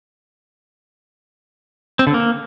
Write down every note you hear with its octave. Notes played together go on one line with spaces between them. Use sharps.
C4
D3
A#3